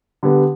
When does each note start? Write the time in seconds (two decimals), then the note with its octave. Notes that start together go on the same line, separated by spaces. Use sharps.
0.23 D3 G3 B3